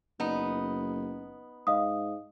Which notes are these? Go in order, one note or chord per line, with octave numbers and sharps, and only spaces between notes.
F#1 B3 D#4
G#2 D#5 F5 D#6